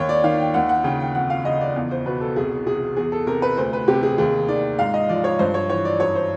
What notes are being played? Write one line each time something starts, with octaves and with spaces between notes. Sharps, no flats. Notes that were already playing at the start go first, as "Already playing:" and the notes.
Already playing: D#2 C#5
D5
D#3 F5
G5
D#2 F#5
F#5
C#3 G5
G5
F2 F#5
F5
C#3 D#5
D5
E2
C5
B2 B4
A4
C2 G#4
C3 G#4
E2 G#4
A4
C3 A#4
B4
D2 C5
B4
C3 G4
G#4
D#2 G#4
D#3 D5
G#2 F5
D#5
F3 D5
C#5
G2 C5
C#5
E3 C#5
D5
F#2 C#5
C5